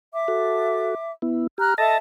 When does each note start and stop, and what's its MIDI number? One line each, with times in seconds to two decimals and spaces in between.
0.13 1.10 76
0.13 1.10 86
0.28 0.95 66
0.28 0.95 69
1.22 1.47 59
1.22 1.47 64
1.58 1.74 67
1.58 1.72 82
1.58 1.72 89
1.58 1.72 90
1.78 1.97 69
1.78 1.98 75
1.78 1.97 76
1.78 1.97 81
1.78 1.98 93
1.78 1.98 94